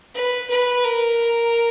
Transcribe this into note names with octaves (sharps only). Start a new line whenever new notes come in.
B4
B4
A#4